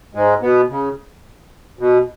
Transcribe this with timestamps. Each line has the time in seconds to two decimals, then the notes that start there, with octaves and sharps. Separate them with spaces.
0.15 G#2 G#3
0.42 B2 B3
0.70 C#3
1.79 B2